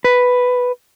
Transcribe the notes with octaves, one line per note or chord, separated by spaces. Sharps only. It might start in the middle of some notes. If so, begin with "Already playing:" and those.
B4